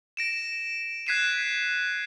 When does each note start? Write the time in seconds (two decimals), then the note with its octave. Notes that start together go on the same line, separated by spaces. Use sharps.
0.17 A#6 D7 E7
1.07 F#6 G#6 B6 C7 D#7 E7